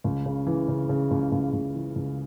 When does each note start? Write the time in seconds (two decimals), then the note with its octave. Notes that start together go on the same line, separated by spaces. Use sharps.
0.04 C#2
0.26 C#3
0.47 E3
0.68 C#3
0.89 C#3
1.11 C#2
1.32 C#2
1.53 C#2
1.75 E3
1.96 C#2